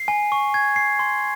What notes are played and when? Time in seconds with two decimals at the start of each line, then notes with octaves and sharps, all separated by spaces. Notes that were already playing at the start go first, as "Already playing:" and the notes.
Already playing: C7
0.08 G#5
0.32 C#6
0.54 G#6
0.76 C7
0.99 C6